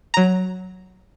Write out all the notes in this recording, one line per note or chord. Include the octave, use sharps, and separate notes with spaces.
F#3 A#5